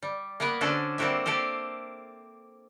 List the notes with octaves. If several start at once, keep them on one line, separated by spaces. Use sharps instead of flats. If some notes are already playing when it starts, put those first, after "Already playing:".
G3
A#3 B3 A#4 B4
D3 C#4 D4 F#4 A4 C5
G3 A#3 C4 F#4 G4 E5
A#3 G4 A4 A#4 C5